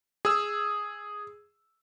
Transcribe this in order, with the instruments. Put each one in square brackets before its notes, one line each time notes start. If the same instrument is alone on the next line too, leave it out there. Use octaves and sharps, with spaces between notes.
[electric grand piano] G#4 E6